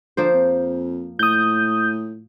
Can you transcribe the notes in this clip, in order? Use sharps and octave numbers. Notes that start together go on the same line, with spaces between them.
D3 F3 A#3 C5
F2
A2 D#6 G6